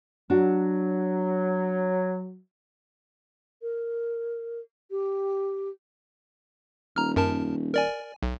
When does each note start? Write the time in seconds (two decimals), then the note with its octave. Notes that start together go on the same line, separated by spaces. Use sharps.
0.30 F#3 D4 F#4
3.62 A#4
4.91 G4
6.96 D#1 A#5 F6
7.16 F#2 A#4 A5
7.74 A#4 D5 G#5
8.23 B1